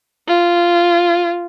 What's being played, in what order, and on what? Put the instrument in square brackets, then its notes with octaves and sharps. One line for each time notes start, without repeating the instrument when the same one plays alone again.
[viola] F4